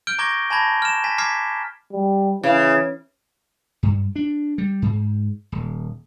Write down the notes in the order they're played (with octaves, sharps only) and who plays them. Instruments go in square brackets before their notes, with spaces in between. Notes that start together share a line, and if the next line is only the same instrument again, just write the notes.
[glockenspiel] F6 G6 D7 G7
A#5 C#6 D6 G#6 A#6 G7
G#5 A5 B5 G#6 A#6
F6 E7
G#5 A6 B6
A#5 D6 F6 G#6 B6 C7
[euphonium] G3
[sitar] C#3 [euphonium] E3
[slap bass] G2
D4
G3
G#2
D#1